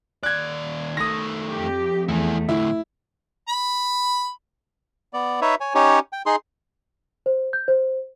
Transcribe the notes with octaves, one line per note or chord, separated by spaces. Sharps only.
D#2 D5 F#6 G#6
D#3 A3 D#6 A#6
F2 G4
E2 A3 E4 G#4
D2 A2 E4
B5
B3 D5
D#4 B4 C#5 E5
C#5 G#5
C#4 D#4 G4 C#5
G5
D#4 G#4 C6
C5
G6
C5